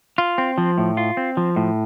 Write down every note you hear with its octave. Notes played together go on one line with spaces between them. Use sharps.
F4
C4
F3
A2
F4
C4
F3
A2